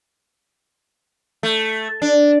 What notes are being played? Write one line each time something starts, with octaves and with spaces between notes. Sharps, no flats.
A3
D4